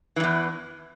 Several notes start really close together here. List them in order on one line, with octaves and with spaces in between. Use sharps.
E3 G2 E2